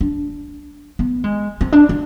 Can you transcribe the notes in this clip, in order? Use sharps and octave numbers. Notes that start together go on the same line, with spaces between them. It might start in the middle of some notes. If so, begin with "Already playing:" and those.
D4
B3
G#3
C4
D4
D4